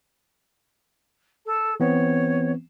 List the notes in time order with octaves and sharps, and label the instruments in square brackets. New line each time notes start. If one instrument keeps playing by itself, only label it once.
[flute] A4
[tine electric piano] E3 B3 C4 [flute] C#5